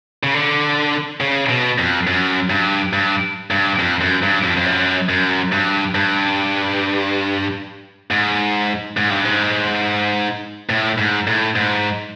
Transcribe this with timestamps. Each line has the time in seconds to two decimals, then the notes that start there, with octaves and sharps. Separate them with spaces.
0.23 C#3
0.34 D3
1.20 C#3
1.49 B2
1.78 F2
2.07 F#2
2.50 G2
2.93 G2
3.51 G2
3.79 F2
4.01 F#2
4.23 G2
4.44 F2
4.57 F2
4.66 F#2
5.09 F#2
5.52 G2
5.95 G2
8.11 G#2
8.97 G#2
9.11 G2
9.25 G#2
10.70 A2
10.98 G#2
11.27 A2
11.56 G#2